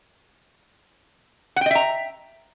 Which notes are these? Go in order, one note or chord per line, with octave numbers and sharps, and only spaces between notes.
D#5 E5 F#5 G5 A#5